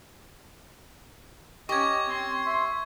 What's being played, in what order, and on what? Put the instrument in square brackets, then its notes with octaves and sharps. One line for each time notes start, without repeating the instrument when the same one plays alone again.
[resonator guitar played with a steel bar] C#4 G4 [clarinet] D#5 [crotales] C#6 G#6
[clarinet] C4 [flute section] C6
[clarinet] E5